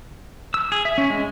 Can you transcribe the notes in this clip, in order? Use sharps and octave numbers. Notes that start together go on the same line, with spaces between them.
E6
G#4
E5
C#4
G#3